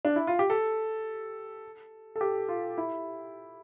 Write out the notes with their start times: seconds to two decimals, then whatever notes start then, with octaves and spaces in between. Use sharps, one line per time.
0.05 D4
0.16 E4
0.27 F4
0.39 G4
0.50 A4
2.16 A4
2.21 G4
2.48 F4
2.78 E4